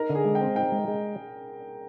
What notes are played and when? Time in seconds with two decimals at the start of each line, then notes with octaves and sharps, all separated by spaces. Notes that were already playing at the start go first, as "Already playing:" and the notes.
Already playing: D#4 A#4
0.09 D3
0.15 G#4
0.25 G#3
0.35 G5
0.41 C4
0.56 D#4 G5
0.72 G#3
0.88 G#3